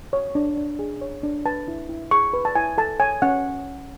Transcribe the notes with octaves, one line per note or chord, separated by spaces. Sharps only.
C#5
D4
D4
G#4
C#5
D4
B4 A5
E4
E4
G#4 C#6
B4
A5
E4 G#5
A4 A5
C#5 G#5
C#4 F#5